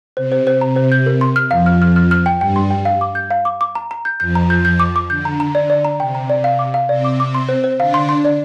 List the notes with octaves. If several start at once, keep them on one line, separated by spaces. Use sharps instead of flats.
C3 C5
C5
C5
C3 A#5
C5
G6
A#4
C6
F6
F2 F3 F5
F6
F6
F6
F6
G5
G2 G3 G5
C6
G5
F5
D6
G6
F5
D6
D6
A#5
A#5
G6
F2 F3 G6
A#5
G6
G6
D6
D6
D3 G6
A#5
A#5
D5
D5
A#5
C3 G5
A#5
D5
F5
D6
F5
C3 C4 D5
D6
D6
C6
C5
C5
D3 D4 F5
C6
C6
D5